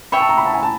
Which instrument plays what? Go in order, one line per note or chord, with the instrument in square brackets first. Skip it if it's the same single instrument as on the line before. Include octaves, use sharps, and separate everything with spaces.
[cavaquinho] C#5 E5 G5 [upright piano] B5
[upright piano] A5
A#5
B5
A5
G#5
A5